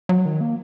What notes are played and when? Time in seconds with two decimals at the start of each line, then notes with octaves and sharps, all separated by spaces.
0.09 F#3
0.25 D#3
0.41 A#3